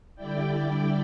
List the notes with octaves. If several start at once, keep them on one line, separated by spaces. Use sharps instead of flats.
D3 G3 E4 D5 G5